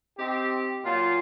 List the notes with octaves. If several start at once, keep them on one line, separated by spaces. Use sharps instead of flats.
C4 D#4 G4
A#2 F#3 F4